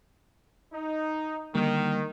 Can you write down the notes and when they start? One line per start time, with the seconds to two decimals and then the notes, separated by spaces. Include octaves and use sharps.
0.73 D#4
1.55 D3 D#3 G3 A#3